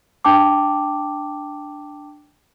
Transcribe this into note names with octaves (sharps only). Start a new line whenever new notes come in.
D4 G5 A5 D6